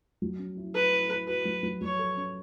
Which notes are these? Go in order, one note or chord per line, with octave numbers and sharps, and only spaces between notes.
F#3
C#4
E4
E4 B4
E4
E4
F#4 B4
F#3
F#3
F#3 C#5
A4
C#4